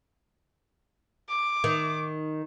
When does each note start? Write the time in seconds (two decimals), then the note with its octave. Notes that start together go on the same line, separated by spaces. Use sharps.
1.29 D6
1.64 D#3